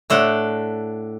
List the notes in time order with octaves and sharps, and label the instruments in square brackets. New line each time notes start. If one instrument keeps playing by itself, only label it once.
[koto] A2 A3 D4 F#5